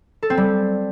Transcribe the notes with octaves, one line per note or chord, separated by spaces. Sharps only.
A4
C4
G3